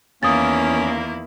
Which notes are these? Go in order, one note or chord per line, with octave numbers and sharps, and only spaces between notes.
E2 D#3 A#3 C#4 E4 D#6 A6